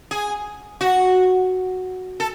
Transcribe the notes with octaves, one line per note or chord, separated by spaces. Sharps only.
G#4
F#4
A4